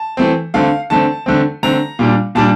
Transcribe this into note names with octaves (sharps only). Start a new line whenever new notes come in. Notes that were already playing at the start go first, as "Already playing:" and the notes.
Already playing: A5
E3 A3 C4
D3 A3 C4 F5
D3 A3 C4 A5
D3 A3 C4
D3 A3 C4 A#5
A#2 G3 D4
A#2 G3 D4 A5